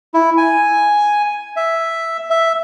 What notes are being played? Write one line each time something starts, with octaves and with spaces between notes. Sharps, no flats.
E4
G#5
E5
E5